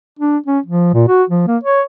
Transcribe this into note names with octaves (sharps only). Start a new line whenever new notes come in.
D4
C#4
F3
A#2
F#4
F3
A#3
C#5